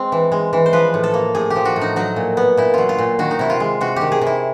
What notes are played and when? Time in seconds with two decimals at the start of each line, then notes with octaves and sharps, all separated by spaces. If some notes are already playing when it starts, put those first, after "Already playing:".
Already playing: G#3 C4
0.12 E3
0.32 G#3
0.53 E3
0.66 C5
0.73 F3 B4
0.94 A2
1.04 A4
1.14 A#3
1.35 A2 G#4
1.50 G4
1.56 F3
1.65 F#4
1.76 A2
1.81 D#4
1.96 F#3 D#4
2.16 A#2
2.37 B3
2.57 A#2 E4
2.74 F#3 F4
2.89 F4
2.99 A#2
3.19 D#3 F#4
3.31 D#4
3.39 C3 E4
3.50 F4
3.60 G#3
3.81 C3 F#4
3.96 D#3 G4
4.12 G#4
4.21 C3
4.27 E4